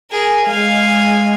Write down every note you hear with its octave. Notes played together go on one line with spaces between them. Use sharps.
G#4 A#4
G#3 F5 G#5